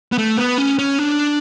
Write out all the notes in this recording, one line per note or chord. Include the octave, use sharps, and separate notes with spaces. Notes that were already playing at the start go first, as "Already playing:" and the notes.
B3
A3
B3
C#4
C#4
D4